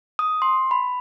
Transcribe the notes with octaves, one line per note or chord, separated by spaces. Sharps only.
D#6
C6
B5